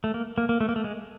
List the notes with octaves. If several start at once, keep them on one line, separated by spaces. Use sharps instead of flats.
A3
A#3
A#3
A#3
A3
A#3
A3
G#3